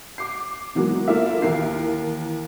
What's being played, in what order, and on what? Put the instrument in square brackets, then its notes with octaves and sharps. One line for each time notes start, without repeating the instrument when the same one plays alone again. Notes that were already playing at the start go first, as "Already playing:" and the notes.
[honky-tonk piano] D6 C7
D#3 E3 F#3 G#3 A#3 B3
A#3 E4 F4 A4 A#4 E5
D#2 E3 A#4 C7